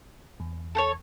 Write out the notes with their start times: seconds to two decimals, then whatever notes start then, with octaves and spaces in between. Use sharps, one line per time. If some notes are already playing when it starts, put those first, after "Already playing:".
0.40 E2
0.75 A4 C5 C#5